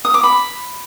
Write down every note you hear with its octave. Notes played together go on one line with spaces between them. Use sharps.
D#6
D6
B5